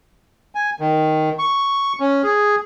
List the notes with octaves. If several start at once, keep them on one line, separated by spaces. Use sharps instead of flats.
G#5
D#3
C#6
C#4
G#4